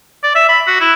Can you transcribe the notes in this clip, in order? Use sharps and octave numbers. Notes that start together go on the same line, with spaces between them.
D5
E5
B5
F#4
E4